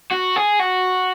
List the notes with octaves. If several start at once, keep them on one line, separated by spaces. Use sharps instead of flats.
F#4
G#4
F#4